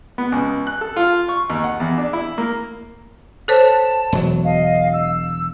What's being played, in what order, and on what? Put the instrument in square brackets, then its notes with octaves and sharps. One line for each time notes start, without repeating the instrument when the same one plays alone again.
[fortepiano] B3
C#2
F#6
A4
F4
C#6
D#2
F#5
E2
D4
E4
A#3
[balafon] A4 C5 C#5 [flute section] A5
[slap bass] E1 F#3
[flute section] D#5 F5
E6